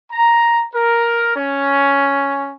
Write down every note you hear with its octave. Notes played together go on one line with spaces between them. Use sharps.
A#5
A#4
C#4